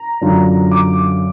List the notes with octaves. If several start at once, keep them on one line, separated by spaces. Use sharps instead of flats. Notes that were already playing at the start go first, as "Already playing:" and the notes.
Already playing: A#5
F#2 D3 F#3 D4 F4
D6